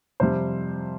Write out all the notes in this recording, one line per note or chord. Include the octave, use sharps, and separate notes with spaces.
F2 C3 G3 C5